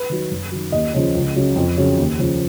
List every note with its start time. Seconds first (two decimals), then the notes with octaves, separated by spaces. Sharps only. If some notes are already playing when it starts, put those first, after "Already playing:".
Already playing: B4
0.10 D#3 F#3
0.31 F#2
0.51 D#3 F#3
0.72 D#2 D#5
0.94 C#3 F3
1.15 C#2
1.36 C#3 F#3
1.56 F2
1.77 C#3 F#3
1.98 D#2
2.19 C#3 F3